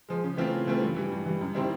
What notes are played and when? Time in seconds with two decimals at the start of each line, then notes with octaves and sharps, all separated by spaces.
0.08 F3 G#3
0.24 C#3
0.38 E3 A3 C4 F4
0.53 C#3
0.67 E3 A3 C4 F4
0.82 G2
0.96 E3 G3
1.11 G2
1.26 E3 G3
1.41 F#2
1.55 D#3 G3 C4 E4